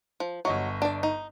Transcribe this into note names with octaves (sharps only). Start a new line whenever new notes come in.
F3
G1 F#3 D#5 C#6
D4 D5
D#4